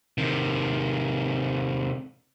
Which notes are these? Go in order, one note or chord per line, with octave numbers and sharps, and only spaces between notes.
C3 D#3